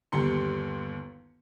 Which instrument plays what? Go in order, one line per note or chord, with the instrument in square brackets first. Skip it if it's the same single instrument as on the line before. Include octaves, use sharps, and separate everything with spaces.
[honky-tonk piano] G1 D#2 G3 C6 C#7